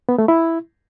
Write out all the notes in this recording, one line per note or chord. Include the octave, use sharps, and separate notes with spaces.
B3
A3
E4